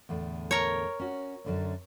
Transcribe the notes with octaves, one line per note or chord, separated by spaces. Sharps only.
E2 A2 D3
A#4 C#5
C#4 F#4
F#2 D3 C#4